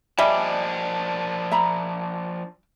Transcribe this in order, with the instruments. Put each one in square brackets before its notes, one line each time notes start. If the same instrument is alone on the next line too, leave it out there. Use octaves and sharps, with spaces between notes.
[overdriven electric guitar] F3 D4 [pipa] G3 [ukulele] D#5 E5 G#5
[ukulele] E5 A#5 B5